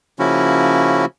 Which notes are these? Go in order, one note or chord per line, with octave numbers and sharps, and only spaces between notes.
C#3 F3 A#3 C#4 E4 F#4